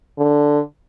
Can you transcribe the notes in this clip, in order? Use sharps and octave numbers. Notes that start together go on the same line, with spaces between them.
D3